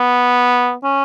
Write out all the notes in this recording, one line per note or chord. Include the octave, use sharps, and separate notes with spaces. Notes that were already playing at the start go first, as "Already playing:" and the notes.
Already playing: B3
C#4